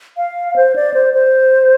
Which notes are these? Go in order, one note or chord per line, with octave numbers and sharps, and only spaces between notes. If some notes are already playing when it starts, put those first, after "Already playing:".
F5
C5
D5
C5
C5